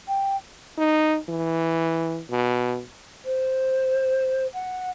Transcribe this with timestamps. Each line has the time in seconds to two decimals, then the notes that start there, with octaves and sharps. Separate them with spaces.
0.08 G5
0.78 D#4
1.29 E3
2.31 B2
3.24 C5
4.53 F#5